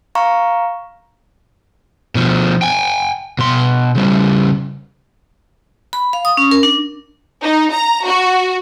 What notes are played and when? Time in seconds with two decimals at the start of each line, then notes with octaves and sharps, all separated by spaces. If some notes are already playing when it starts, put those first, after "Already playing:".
0.15 F5 A#5 C#6
2.15 B2 F3
2.62 G5 G#5
3.39 B2 C6
3.95 C#3 G3
5.93 B5
6.13 F5
6.25 D#6
6.37 C#4
6.51 A#4
6.63 D4
7.44 D#4
7.74 A#5
8.07 F#4